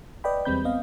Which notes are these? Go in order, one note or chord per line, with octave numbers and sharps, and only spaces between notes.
B4 D5 D#5 G5 B5
E2 G3 G#3 C4 B5 G6
B3 C4 D#5 F5